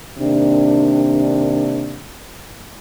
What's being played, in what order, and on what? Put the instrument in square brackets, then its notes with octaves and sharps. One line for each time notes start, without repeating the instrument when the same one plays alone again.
[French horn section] C3 D#3 A#3 D4